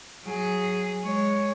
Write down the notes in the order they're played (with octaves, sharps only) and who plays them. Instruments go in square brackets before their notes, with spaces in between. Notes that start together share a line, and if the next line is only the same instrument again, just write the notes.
[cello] F#3 G#4
G#3 C#5